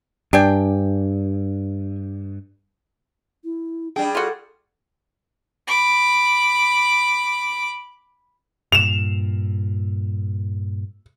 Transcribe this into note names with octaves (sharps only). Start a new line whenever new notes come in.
G2 D4 G5 G#5
E4
G3 D4 G#4 G5
F4 F#4 A4
B5 D6
G2 A#2 E7 F7